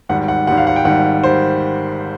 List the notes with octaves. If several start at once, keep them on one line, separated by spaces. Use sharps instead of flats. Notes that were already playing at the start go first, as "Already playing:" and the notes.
G#1 G#2 D#3 G3 F#5
F#5
G#1 G#2 D#3 G3 F#5
F5
F#5
G5
G#1 G#2 D#3 G3 F#5
D#3 G3 C5